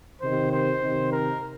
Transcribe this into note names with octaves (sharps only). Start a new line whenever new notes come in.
C3 D#3 C5
C5
C3 D#3
A#4